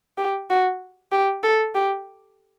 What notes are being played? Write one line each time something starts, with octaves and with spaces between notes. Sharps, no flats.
G4
F#4
G4
A4
G4